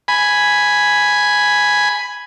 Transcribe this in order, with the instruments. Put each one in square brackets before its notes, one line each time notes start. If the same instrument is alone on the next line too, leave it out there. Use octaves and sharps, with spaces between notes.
[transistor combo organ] G#5 B5